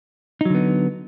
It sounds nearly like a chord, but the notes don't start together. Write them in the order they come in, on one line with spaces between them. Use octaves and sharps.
D#4 F#3 D3 B3